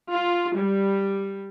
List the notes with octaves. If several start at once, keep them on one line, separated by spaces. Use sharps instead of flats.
F4
G3